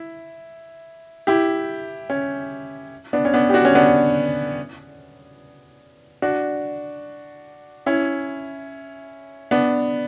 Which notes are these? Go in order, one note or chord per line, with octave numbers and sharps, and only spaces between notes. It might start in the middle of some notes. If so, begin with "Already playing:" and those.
Already playing: E4
E4 G4
C#4
B3 D4
C#4
B3 D4
G4
D4 F#4
C#4
B3 D4
D4 F#4
C#4 E4
B3 D4